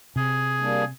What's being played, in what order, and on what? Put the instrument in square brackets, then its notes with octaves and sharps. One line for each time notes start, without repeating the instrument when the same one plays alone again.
[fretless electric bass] C3 [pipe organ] G#4
[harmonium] G3 A#3 D4